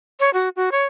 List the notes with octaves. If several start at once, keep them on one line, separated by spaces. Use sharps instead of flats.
C#5
F#4
F#4
C#5